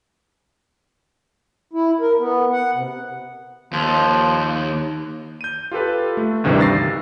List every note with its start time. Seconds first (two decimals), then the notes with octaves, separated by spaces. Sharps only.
1.73 E4
2.00 A#4
2.19 B3
2.52 F#5
2.74 C3
3.73 D#2 F3
5.41 G6 D#7
5.71 F4 G4 A4 B4
6.17 A3
6.44 D2 G2 C3 D#3 E3 G3
6.60 E6 A6 A#6 C7